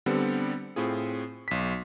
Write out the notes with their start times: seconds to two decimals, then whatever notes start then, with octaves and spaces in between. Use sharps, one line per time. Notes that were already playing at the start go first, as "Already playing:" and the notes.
0.06 D3 G3 B3 C4
0.76 A2 C4 F4 G#4
1.48 B1 B6